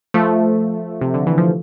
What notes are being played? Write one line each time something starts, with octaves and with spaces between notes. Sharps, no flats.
F3 A3
C3
D3
E3
F3